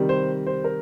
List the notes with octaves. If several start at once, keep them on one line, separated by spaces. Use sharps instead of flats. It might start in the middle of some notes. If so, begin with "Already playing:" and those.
Already playing: C3 D#3 G3
C5
C5
A#4